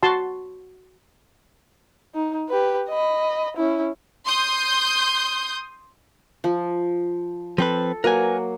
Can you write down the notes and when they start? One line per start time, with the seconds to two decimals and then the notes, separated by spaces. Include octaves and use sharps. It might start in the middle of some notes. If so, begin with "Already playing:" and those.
0.03 F#4 A5 C6
2.15 D#4
2.49 G4 B4
2.89 D#5 B5
3.57 C#4 E4
4.26 C6 D#6 G6
6.44 F3
7.58 F3 C4 A4 B4
8.04 F#3 A#3 A#4 B4 G#5